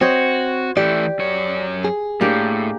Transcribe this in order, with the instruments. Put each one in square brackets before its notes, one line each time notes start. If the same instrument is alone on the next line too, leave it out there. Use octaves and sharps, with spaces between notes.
[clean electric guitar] C4 [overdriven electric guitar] F#4 [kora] C5 C#5 D#5
[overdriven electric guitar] E3 A3 [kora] G4 [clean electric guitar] D5
[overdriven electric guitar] F#2 C#5
[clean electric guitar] G#4
[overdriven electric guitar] A2 [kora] A#3 D4 G4